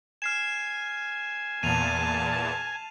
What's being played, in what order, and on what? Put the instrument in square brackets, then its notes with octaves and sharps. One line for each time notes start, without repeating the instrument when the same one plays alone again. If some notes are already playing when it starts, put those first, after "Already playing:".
[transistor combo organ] G#5 [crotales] F6 C7 E7
[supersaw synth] E2 A#2 [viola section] A5 [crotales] D#7 F7